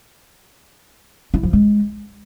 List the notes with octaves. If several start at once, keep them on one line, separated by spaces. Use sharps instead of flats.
E4
F3
G#3